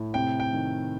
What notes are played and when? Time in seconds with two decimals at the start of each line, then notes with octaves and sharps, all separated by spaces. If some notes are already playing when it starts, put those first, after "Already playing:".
Already playing: A2
0.14 C3 G5
0.40 G5
0.53 D#3